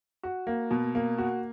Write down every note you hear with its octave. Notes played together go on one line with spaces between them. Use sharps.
F#4
A#3
B2
A#3
F#4